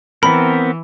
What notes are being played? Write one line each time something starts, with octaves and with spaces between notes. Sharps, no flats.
E3 B3 C4 A#4 B5